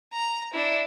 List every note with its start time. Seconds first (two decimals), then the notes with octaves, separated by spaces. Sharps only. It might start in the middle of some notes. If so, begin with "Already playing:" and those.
0.13 A#5
0.54 D4 E4